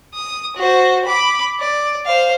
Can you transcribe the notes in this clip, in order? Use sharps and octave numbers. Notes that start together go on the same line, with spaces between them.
D#6
F#4 C5
B5 D6
D5
C5 F5